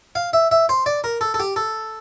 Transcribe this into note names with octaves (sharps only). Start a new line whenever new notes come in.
F5
E5
E5
C5
D5
A#4
A4
A4
G4
A4